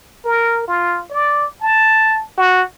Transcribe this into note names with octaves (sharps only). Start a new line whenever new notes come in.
A#4
F4
D5
A5
F#4